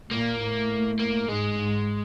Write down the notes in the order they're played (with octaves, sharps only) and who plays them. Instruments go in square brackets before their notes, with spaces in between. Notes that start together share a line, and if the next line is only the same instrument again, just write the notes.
[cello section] A#2 [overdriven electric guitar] A#3
[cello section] A2
[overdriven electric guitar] A#3
[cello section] G#2 [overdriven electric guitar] G#3
[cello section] G#2